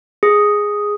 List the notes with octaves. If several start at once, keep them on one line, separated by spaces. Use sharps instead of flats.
G#4